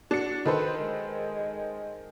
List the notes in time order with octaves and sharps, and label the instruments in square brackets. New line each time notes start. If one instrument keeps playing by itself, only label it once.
[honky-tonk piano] D4 C#7 [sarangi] F#4
[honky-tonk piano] D#3 A4 C5 [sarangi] B4
[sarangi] G#3